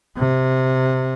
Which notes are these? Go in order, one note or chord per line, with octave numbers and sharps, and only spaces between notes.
C3